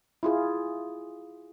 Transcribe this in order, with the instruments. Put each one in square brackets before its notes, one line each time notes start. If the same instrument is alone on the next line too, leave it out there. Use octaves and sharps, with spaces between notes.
[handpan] E4 F4 G#4